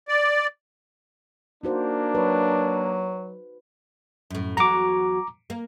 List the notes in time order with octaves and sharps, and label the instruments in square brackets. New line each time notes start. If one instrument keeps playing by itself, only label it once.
[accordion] D5
[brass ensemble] A#3 [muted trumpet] D4 [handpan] D#4 F#4 C5
[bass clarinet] F#3 [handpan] B4
[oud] F#2 A2
[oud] E2 F#3 F#4 [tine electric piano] A#5 D6
[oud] A#3